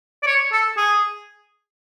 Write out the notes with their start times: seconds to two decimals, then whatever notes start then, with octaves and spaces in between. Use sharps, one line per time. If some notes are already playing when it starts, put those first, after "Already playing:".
0.23 D5
0.27 C#5
0.53 A4
0.77 G#4